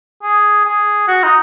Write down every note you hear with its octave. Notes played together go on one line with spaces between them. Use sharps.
G#4
G#4
F#4
D#4